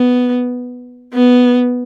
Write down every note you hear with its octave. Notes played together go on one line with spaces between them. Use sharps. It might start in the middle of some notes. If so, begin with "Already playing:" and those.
Already playing: B3
B3